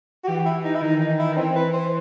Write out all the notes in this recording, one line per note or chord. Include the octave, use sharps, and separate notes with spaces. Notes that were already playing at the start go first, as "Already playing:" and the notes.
F#4
E3 G4
E4
D#4
E4
D#3 D#4
D#4
E4
D#4
E3 C4
B4
C5